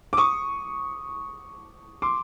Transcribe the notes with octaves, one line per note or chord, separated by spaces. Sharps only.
D6
C#6 D#6
C6 D6